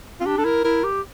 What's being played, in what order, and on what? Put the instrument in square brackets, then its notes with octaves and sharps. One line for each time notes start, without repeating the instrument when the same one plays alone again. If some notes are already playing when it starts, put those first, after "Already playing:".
[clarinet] C4 [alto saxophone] F4
[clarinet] D4 [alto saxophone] G4
[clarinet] D4 [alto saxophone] A4
[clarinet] E4 [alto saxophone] A#4
[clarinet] E4 [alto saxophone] A#4
[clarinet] G4